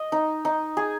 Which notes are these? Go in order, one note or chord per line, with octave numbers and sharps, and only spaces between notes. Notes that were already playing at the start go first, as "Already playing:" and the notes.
Already playing: D#5
D#4
D#4
G#4